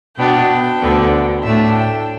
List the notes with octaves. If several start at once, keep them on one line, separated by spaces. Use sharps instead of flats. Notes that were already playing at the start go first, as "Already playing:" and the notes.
B2 B3 D4 G5
D2 D3 B3
A2 A3 D4 E5
G5